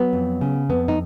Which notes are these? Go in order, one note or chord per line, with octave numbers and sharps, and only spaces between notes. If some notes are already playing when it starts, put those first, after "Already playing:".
Already playing: F#3 B3
F2
C#3
F2 B3
D#4